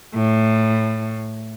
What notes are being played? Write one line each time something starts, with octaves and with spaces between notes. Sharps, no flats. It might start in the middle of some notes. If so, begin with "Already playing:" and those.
A2